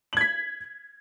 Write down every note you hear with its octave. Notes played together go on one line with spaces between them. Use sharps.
G#6 B6 F#7